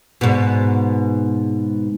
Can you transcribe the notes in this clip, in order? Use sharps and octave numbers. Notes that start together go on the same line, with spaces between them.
G#2 B2